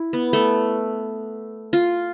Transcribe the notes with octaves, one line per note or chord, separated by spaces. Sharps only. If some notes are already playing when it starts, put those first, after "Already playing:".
Already playing: E4
B3
A3
F4